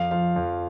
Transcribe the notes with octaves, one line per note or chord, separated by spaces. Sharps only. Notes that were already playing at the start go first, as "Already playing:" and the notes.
Already playing: F2 F5
F3 F5
F2